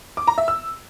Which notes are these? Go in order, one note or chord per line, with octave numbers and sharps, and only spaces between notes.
D6
A#5
E5
E6